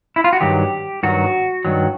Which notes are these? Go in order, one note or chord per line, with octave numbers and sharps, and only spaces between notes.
E4
F4
F#4
G2 D#3 F#3 G4
G2 D#3 F#3 F#4
G2 D#3 F#3